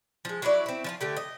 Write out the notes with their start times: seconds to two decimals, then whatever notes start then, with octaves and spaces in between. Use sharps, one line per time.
0.25 F3 G#3
0.42 F#3 C#4 E4 D5
0.66 C4 E4
0.84 F3 E4 F4
1.01 D3 A3 G4
1.17 D#5